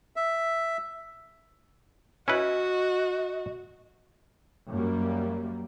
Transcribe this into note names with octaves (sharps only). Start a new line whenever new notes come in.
E5
C#4 E4 F#4 B4 D#5
F#2 G3 A#3